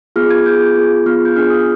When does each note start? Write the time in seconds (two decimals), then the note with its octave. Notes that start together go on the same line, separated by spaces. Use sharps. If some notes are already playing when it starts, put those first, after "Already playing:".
0.16 B3 F4 G#4 F6
0.30 G#6
0.46 B3 F4 G#4 G6
0.76 B3 F4 G#4
1.06 B3 F4 G#4 F6
1.25 G6
1.35 B3 D4 F4 G#4 F6
1.50 D#6